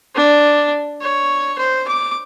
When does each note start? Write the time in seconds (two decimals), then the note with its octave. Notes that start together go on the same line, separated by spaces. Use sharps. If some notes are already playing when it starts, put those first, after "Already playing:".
0.15 D4
1.01 C#5
1.58 C5
1.88 D6